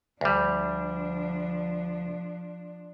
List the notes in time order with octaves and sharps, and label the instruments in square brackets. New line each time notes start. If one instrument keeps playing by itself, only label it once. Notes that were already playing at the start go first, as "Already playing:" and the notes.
[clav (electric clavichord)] D2 G3 [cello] F3 D4